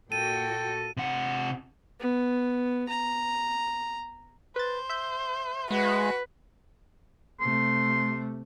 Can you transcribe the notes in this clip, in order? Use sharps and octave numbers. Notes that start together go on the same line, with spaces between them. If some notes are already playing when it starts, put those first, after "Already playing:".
A#2 F#4 A4 G5 D#7
C3 F#5
B3
A#5
B4 C5 A6
E5 G6
G#3 F#4 B4
C3 A3 C6